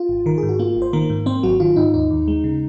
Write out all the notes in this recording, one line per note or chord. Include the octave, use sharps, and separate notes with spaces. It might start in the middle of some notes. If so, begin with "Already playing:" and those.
Already playing: F4
G#1
D#3 A#4
G#2 G#4
F#4
A#3 F4
G#1
C5
D#3 A#3 A#4
G#2
A#3 C4 C5
G#1 F#3 F#4
D#3 F4
G#2 D#4
D#2 D#4
D#2
G#3
C#3